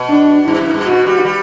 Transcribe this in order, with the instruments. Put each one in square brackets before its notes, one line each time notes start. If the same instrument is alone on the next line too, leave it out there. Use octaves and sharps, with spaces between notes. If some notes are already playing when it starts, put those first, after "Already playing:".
Already playing: [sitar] B2
[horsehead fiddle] D4
[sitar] G2 [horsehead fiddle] E4
[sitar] F#2
G2
[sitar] B2 [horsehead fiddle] F#4
[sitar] G3
G3